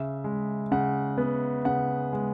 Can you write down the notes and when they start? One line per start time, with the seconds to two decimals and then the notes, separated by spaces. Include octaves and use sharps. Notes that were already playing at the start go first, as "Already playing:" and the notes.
Already playing: C#3 E5
0.24 G#3
0.71 C#3 F#5
1.18 B3
1.65 C#3 F#5
2.13 G#3